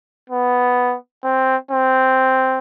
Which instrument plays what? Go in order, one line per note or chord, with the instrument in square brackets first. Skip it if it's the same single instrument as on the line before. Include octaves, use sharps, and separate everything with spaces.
[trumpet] B3
C4
C4